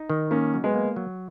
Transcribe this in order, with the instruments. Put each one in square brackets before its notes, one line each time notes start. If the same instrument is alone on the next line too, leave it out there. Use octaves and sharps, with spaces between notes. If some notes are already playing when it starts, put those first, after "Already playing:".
Already playing: [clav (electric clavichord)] D#4
D#3
[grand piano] A#3 C#4 [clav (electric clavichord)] D#4
[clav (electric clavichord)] F#3
[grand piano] G#3 B3
[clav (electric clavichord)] A#3
F#3